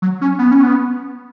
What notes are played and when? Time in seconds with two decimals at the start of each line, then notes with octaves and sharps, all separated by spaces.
0.02 F#3
0.21 C#4
0.39 B3
0.51 C#4
0.63 B3